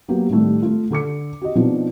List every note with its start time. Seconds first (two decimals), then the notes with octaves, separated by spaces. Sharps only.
0.08 F#3 A#3 B3 F#4 G4
0.29 A2 D#3 G3 A3
0.62 A3 F4
0.90 D3 A4 D6 C#7
1.42 F#4 G4 D#5
1.55 B2 F3 C4 D4 D#4 F4